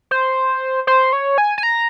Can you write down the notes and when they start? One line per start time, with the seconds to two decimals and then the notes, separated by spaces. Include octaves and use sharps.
0.11 C5
0.87 C5
1.13 C#5
1.38 G#5
1.58 G#5
1.63 A#5